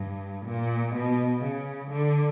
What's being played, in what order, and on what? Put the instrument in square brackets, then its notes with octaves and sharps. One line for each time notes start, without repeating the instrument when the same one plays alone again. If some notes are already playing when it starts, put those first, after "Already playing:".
Already playing: [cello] G2
A#2
B2
C#3
D3